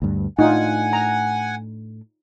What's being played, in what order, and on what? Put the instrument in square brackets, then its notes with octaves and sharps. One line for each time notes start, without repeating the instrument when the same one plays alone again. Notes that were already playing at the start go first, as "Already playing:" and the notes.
[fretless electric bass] D2 G2
[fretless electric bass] A2 D4 [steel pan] D#4 F4 [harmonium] F#5 G#5
[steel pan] A#5